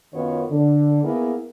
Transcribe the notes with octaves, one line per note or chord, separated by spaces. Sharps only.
F#2 D#3 B3 C#4 F4 C#5
D3
A#3 B3 E4 G#4 A#4